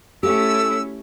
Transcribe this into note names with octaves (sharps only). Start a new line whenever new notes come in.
A3 C#4 E4 G4 A4 E6